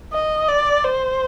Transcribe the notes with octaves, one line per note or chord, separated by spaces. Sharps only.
D#5
D5
C5